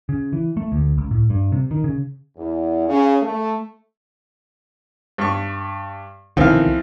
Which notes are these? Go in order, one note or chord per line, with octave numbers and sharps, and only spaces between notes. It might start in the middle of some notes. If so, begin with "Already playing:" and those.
C#3
E3
A3
D2
C#2
A2
G2
C3
D#3
C#3
E2
C#3
A3
G2 C#6
C2 F2 B2 D#3 E3 F5